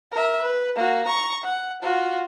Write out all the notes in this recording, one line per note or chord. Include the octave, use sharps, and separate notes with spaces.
A#4 E5
B4
A#3 F#4
A#5 C#6
F#5
F4 F#4